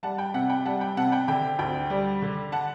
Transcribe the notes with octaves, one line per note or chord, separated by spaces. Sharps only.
G3 F#5 A5
G5
C3 F#5
G5
G3 F#5 A5
G5
C3 F#5 A5
G5
D3 G5
D2 G5
G3
D3
F#5 A5